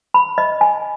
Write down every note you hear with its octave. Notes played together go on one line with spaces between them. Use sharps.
B5
D#5
G#5